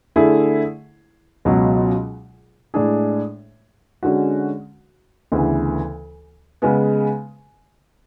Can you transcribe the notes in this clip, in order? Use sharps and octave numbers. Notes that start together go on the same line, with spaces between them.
D3 A3 E4 G#4
C#2 B2 F#3
A2 G#3 D4 G#4
D3 G#3 C#4 F#4
D2 C#3 E3 B3
C#3 G#3 B3